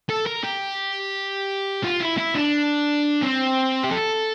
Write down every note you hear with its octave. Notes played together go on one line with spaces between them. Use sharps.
A4
A#4
G4
F4
E4
E4
D4
C4
G4
A4